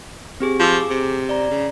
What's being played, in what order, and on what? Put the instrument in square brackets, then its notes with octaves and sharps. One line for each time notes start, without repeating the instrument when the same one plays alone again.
[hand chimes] C4 G4 G#4
[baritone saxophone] F3 [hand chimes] G#4 D6 E6
[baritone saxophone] C3
[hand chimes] D5 A#5
[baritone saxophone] C#3